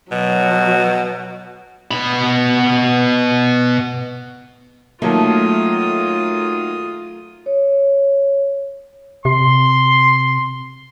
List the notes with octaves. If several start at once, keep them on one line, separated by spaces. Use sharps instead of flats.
B2 F#3
B2 B5
D#3 F#3 A3 A#3 F4 D#6
C#5
C3 C6